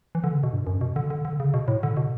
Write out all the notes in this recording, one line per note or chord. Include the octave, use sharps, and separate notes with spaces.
E3
D3
C#3
B2
G2
F#2
B2
D3
D3
D3
C#3
B2
A2
D3
B2